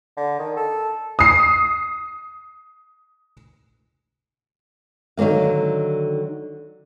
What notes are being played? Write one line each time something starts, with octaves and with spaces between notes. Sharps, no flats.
D3
D#3
A4
D#6 C7
D3 D#3 F#3 A#3 F5